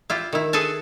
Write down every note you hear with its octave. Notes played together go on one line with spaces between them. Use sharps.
E4 F4 G4
D#3 E4
G#4 A4 B4 G#5 A5